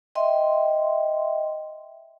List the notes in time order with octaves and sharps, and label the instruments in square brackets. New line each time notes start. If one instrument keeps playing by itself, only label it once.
[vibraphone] D#5 E5 G5 C6